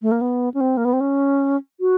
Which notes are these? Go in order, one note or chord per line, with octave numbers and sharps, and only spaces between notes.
A3
A#3
B3
C#4
C4
A#3
B3
C4
C#4
F#4